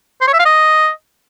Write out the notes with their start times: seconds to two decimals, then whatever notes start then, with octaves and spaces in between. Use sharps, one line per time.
0.21 C5
0.27 C#5
0.33 E5
0.39 F5
0.45 D#5